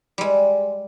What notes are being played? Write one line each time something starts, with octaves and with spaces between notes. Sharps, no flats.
G3 G#3